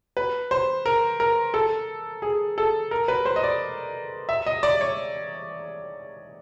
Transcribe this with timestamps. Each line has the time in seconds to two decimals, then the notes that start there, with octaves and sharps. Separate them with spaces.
0.17 B4
0.51 C5
0.86 A#4
1.20 A#4
1.54 A4
2.22 G#4
2.58 A4
2.91 A#4
3.08 B4
3.25 C5
3.36 D#5
3.43 D5
4.29 E5
4.46 D#5
4.63 D5
4.81 C#5